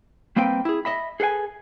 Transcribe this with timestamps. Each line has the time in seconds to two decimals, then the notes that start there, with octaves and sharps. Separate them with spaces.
0.36 G3 A#3 C4 B4 G5
0.65 E4 G#4
0.85 D#5 E5 B5
1.20 G#4 A4 B4 F5 G#5